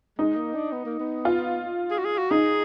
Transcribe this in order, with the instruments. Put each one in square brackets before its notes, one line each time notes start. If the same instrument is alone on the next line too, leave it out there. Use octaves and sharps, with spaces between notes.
[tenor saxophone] G#3 [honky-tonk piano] D#4
[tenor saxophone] A#3
D4
B3
A#3
B3
[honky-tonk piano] F4
[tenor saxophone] G#4
F#4
G#4
F#4
[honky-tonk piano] D#4 [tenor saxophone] G#4